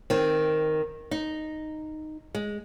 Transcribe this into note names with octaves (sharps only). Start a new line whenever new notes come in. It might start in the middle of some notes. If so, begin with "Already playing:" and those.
D#3 C4
D#4
G#3